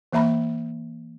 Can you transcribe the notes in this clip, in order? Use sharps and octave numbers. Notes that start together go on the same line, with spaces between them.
E3 A#3 E5 A#5 B5